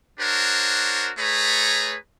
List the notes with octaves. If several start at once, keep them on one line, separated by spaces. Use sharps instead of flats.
D4 F#4 A#4 C5 C#5
A3 G#4 B4 C#5 A#5